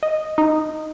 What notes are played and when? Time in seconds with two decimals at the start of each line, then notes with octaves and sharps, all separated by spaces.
0.03 D#5
0.38 D#4